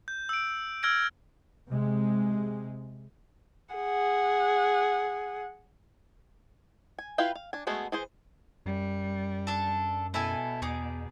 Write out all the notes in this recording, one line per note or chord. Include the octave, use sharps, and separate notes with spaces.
G6
E6 D7
E6 F6 G#6 A#6 D7
C3 G#3
G#4 F#5
G#5
E4 F4 B4 F5 G5
F5
D4 G#5
G#3 A3 B3 F#4 G#4
E3 G#4 C5
F#2 G3
D4 A4
B2 E4 A4 G#5
E2 D#4 G#4 D6